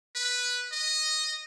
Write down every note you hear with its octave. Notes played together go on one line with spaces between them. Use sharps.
B4
D#5